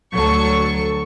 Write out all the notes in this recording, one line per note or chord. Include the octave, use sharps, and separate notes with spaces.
D2 F#3 A4 C#6